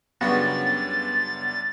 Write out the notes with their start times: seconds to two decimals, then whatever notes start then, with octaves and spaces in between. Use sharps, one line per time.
0.21 F#2 C#3 G3 B3 D4 F#4 A6